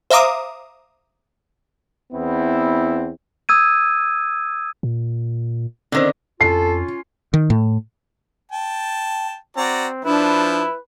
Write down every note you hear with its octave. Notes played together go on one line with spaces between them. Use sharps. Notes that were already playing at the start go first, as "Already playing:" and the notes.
C5 E5 F5 A#5 D6 D#6
E2 B3 C4 E4
D#6 E6 G#6 D#7
A#2
D3 D#3 C4 C#4 C5
F2 C#4 F4 A4 C7
D#3
A2
G5 A5
C4 F#4 D5 A#5
F3 D4 E4 B4